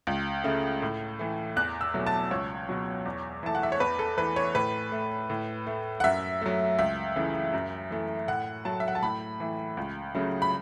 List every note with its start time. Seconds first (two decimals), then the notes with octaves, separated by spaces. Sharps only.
0.07 C#2
0.44 C#3 A3
0.82 A2
1.19 E3 A3
1.56 E2 F#6
1.81 E6
1.94 B2 F#3 A3
2.07 A5
2.31 C#2 C#5
2.69 B2 F#3
3.05 E2
3.43 E3 A3 A5
3.55 F#5
3.63 E5
3.72 C#5
3.80 E2 B4
3.99 A4
4.17 E3 A3 B4
4.36 C#5
4.55 A2 B4
4.92 A3
5.30 A2
5.67 A3
6.00 F#5
6.04 F#2 E5
6.42 F#3 A3
6.79 C#2 E5
7.16 C#3 E3 A3
7.53 F#2
7.91 E3 A3
8.28 A2 F#5
8.65 F#3 A3 A5
8.80 E5
8.88 F#5
8.95 A5
9.02 A2 B5
9.40 E3 A3
9.77 C#2
10.15 C#3 F#3 A3
10.42 B5